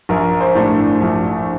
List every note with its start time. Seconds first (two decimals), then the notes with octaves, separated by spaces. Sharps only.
0.09 A#1 A#4
0.40 C5
0.55 A2 A3 D4
1.01 A#1